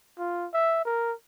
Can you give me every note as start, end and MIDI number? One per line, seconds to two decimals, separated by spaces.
0.19 0.48 65
0.53 0.81 76
0.85 1.13 70